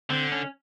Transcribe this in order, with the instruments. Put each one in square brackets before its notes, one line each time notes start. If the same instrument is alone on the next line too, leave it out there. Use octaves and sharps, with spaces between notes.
[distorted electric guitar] D3 [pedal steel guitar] C4
[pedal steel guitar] C#4